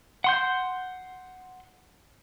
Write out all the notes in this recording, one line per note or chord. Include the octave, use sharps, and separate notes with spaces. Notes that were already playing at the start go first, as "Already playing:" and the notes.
F#5 C6 G6